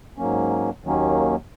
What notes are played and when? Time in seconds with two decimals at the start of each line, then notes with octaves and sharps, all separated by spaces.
0.18 G#2 F#3 A#3 C#4
0.84 D#2 D#3 F#3 A#3 C#4